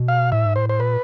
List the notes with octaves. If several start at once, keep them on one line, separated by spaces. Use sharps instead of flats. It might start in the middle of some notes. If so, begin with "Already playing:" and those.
Already playing: B2
F5
A2 E5
G#2
A2 C5
C5
A#2 B4